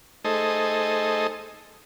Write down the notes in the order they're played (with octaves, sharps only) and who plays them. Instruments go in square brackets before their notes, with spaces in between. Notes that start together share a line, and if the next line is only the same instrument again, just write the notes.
[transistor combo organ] A3 D#4 G#4 A4 C5 D#5